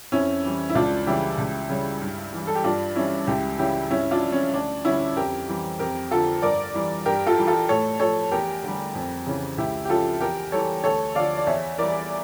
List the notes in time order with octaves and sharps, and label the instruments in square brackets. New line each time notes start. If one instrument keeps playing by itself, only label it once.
[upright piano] F2 C#4 E4
E3 G3
E4
C#2 D4 F4
C#3 E3 G3 E4 G4
C#2
C#3 G3
G2
E3 G3
A4
G4
G2 D4 F4
E3 G3 C#4 E4
C#2 E4 G4
C#3 E3 G3 E4 G4
G2 C#4 E4
D4 F4
F3
C#4
D2 D4
D3 G3 C#4 E4
F2 G4 A#4
E3 G3
F2 G4 A#4
D3 F3 F4 A4
G2 A#4 D5
E3 G3
G2 G4 A#4
F4 A4
E3 G3
F4 A4
A2 A4 C#5
F3 A4 C#5
E2 G4 A#4
D3 G3
F2
C#3 E3
C#2 E4 G4
G4
C#3 F3 F4 A4
E2 G4 A#4
E3 G3 A4 C#5
D2 A4 C#5
D3 F3 D5 F5
D5
E2 C#5 E5
E3 G3 A#4 D5